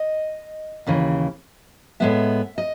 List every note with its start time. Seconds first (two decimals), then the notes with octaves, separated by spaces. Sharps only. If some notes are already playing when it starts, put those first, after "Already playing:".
Already playing: D#5
0.86 D#2 C#3 E3
2.00 A2 G#3 B3 E5
2.58 D#5